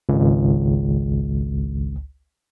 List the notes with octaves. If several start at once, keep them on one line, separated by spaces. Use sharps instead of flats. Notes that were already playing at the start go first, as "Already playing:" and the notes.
G#1 C#2